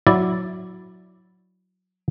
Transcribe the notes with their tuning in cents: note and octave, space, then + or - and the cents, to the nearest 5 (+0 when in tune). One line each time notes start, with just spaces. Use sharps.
F#3 -10 E4 -5 D5 +0